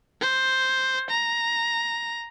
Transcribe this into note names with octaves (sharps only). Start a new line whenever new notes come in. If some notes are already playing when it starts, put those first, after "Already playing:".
C5
A#5